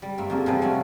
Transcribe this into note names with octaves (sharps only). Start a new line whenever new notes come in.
G3
G2 A#3 E5
F2 A#3 G#4
C3 E3 F3 G3 G#4 B4
G3 A3 C#4 D4 F#4